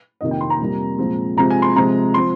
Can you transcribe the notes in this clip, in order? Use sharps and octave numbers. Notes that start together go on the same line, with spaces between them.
F2 C3 D#3 A#3 D#5
G5
C6
A#5
F2 C3 G3 A#3
A#2 F3 G#3 C4
C3 F3 G#3 C4 A#5
G#5
C6
C3 F3 G#3 C4 A#5
F3 C4 C6